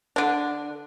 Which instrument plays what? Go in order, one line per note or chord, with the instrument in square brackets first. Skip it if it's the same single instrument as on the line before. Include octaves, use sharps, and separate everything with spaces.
[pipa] D3 D4